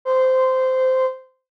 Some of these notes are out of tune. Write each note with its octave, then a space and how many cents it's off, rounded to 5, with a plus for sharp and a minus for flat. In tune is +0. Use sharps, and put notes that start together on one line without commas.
C5 -15